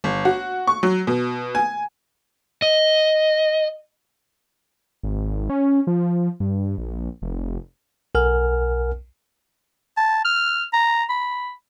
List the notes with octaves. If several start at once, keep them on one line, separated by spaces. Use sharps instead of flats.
G1
F#4
C#6
F#3
B2
G#5
D#5
G#1
C#4
F3
G2
A#1
F1
B1 A#4 F#5 G#5 F6
A5
F6
A#5
B5